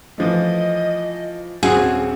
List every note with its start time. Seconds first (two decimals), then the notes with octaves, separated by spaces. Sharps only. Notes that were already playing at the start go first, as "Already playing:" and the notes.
0.18 E3 F3 A3 D#5
1.63 D#1 C4 C#4 F#4 G#4